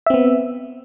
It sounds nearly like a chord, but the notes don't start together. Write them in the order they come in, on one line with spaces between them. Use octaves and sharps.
E5 C4 B3